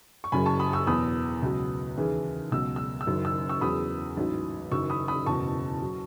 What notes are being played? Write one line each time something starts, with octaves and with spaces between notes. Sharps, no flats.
C#6
F#1 F#2 C#3 F#3 G#5 B5
A5 C#6
B5 D#6
C#6 E6
E2 B2 F#3 B5 D#6
C#2 B2 F#3
D#2 C#3 E3
C#2 B2 F#3 E6
E6
E6
F#1 F#2 D#3 F#3
E6
C#6 E6
E2 C#3 F#3 B5 D#6
A1 G#2 F#3
F#1 F#2 D#3 F#3 C#6 E6
B5 D#6
B5 D#6
F#1 E2 B2 A5 C#6
F#3